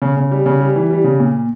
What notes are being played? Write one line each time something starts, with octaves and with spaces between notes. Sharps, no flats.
C#3
C#3
G3
C#3
G3
E3
G3
C#3
A#2